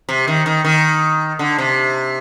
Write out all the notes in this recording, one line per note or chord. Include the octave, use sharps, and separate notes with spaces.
C3
D#3
D#3
D#3
D3
C3